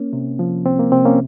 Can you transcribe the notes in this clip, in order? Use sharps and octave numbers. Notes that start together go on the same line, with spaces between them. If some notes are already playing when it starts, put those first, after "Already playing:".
Already playing: A#3 C#4
C3
F3
C2 C4
A#3
C3 C4
A#3 C#4